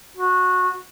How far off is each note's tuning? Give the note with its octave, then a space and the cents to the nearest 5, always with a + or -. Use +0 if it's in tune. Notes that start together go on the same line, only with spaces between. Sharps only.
F#4 -20